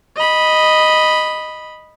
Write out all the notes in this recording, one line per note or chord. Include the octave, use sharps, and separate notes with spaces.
D#5 B5